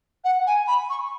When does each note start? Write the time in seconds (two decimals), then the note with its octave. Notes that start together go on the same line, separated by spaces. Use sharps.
0.24 F#5
0.46 G#5
0.67 B5
0.90 C#6